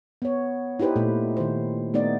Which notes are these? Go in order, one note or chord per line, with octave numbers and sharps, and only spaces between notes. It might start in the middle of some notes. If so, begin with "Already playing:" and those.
B3 C#5
D#4 E4 G4 B4 C5
A#2 A3 A4
D#3 C5
A3 B3 D#4 D5